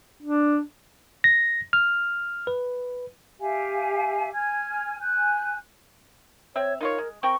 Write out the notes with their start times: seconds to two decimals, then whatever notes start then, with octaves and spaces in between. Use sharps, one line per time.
0.23 D4
1.24 A#6
1.73 F6
2.47 B4
3.40 G4 E5 F5 G#5
4.32 G#5 F6 G#6
4.99 G#5 F#6 G6
6.56 C4 C#5 E5
6.81 D#4 F4 A#4 C#5
6.98 G#3
7.23 C4 A#4 G5 C#6